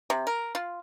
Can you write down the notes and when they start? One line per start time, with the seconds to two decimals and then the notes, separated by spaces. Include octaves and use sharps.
0.10 C3
0.27 A#4
0.55 F4